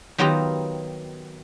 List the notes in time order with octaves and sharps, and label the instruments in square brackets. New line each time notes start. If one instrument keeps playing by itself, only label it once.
[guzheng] D#3 F#3 B3 F4 G4 A#5